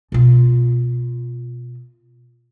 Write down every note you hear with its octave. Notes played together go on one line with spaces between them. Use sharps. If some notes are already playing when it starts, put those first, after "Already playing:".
B2 F4